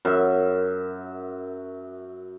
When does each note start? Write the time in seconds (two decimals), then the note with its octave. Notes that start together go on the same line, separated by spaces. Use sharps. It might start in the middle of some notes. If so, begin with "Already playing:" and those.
0.05 F#2 E5